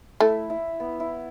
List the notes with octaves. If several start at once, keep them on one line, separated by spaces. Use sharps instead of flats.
A3 E4
E4
B3
E4